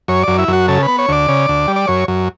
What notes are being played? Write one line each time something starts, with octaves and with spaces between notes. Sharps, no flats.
F#2 C#5
F#2 D5
E4
F#2 F#4
C#3 A4
B4
B3
C#5
D2 D5
C#3
D2
G3
D5
F#2 C#5
F#2